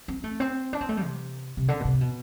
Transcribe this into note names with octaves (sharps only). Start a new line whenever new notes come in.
C4
A3
C4
D4
C4
A3
G3
C3
C3
D3
B2
C3
B2